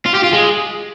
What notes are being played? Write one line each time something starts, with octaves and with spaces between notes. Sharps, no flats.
F4
G4
F4
G#3